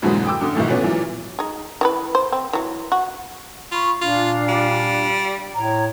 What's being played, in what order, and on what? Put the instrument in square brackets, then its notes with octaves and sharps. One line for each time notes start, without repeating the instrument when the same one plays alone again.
[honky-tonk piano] F2 G#2 B2 D3 E3 F#3
G5 D6 E6
F#2 D3 D#6
B1 D#3 E3 A3
A#2 F#3 B3 C#4
A#2 E3 F#3
[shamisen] D#4 G#4
E3 G#4 B4
C5
C4
E3 F#3
F#4
[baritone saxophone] F4 [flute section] B5 C#6
[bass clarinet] A#2 [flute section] D4 F5 [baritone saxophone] F4
[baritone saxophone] G3
[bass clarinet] A2 [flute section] C#5 A#5